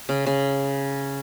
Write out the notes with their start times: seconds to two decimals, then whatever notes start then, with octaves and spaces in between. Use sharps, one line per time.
0.09 C#3
0.27 C#3